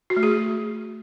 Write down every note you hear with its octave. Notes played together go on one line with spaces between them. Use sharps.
F#4
A3
G#4